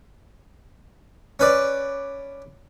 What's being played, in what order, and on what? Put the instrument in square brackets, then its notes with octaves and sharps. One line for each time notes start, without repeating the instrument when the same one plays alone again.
[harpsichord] C#4 B4 D5